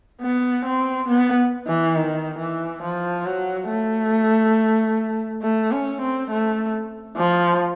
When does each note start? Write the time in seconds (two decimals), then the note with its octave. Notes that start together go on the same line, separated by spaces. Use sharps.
0.22 B3
0.66 C4
1.08 B3
1.67 E3
1.96 D#3
2.39 E3
2.83 F3
3.25 F#3
3.70 A3
5.43 A3
5.72 C#4
6.02 C4
6.31 A3
7.17 F3